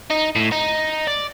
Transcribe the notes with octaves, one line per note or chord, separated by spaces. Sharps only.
D#4
A2
D#4
D5